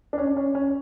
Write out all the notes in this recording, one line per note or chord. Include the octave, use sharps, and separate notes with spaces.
D4
C#4
C#4
C#4